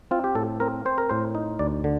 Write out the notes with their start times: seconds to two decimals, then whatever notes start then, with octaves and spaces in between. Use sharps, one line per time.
0.11 C4 F4
0.24 G4
0.35 A2 A4
0.60 C4 A#4
0.85 C4 C5
0.98 A#4
1.09 A2 C5
1.35 D#4
1.59 D2 D5
1.84 D3